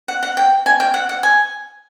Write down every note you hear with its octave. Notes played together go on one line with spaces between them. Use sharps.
F#5
F#5
G5
G#5
G5
F#5
F#5
G#5